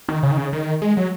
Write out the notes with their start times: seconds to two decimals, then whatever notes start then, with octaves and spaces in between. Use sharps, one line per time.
0.09 D#3
0.23 C#3
0.31 D#3
0.37 C#3
0.53 D#3
0.82 G#3
0.97 F#3